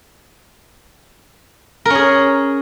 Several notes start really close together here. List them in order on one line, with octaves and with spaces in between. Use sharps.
A#4 C#4 G#4